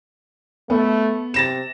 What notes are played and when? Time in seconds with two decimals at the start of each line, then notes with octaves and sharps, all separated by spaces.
0.70 A3 B3
1.34 C3 A6 A#6 E7